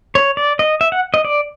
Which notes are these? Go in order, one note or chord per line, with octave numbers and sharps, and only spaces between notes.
C#5
D5
D#5
E5
F#5
D#5
D5